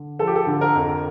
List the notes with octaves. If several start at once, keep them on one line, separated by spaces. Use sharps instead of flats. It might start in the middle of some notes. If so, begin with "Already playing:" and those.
Already playing: D3
F3 A4
G4
A4
D3
A#4
F2